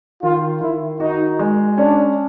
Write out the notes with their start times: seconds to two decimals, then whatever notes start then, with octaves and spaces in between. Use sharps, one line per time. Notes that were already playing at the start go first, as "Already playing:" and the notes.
0.23 D#3 F4
0.61 D#3 E4
1.00 D#4 F#4
1.39 G#3
1.77 C#4 D4